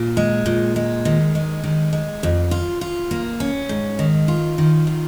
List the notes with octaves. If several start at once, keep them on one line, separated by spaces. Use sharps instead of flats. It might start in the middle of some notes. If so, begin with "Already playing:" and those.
Already playing: A#2
G#3
A#2
G#3
D#3
G#3
D#3
G#3
F2
F4
F4
A#3
C#4
G#2
D#3
F4
D#3
F4